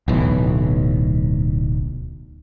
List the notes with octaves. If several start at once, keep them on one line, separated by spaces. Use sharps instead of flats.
D1 B1 E3